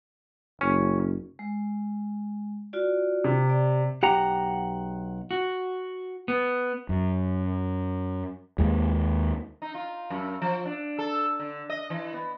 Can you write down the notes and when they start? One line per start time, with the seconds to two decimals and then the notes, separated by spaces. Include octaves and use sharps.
0.61 F#1 C#4
1.39 G#3
2.73 F4 F#4 D5
3.24 C3
3.50 D5
4.03 B1 G4 F#5 A#5
5.31 F#4
6.28 B3
6.89 F#2
8.58 D#2 G#3
9.62 D#4
9.75 F4
10.10 F#2
10.42 F3
10.65 D4
10.99 A4
11.40 D3
11.70 D#5
11.90 E3
12.14 B3